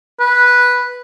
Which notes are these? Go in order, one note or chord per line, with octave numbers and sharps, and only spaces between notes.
B4